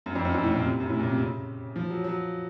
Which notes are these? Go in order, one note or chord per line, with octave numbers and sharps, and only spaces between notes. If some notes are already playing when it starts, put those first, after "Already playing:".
F#2
F2
F#2
F2
A2
A#2
C3
F#2
A2
A#2
C3
C#3
F3
F#3
F#3